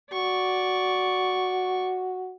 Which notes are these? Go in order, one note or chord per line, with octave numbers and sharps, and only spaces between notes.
F#4 D5 C#6